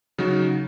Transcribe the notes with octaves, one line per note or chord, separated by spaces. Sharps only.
C#3 F#3 D#4 F#4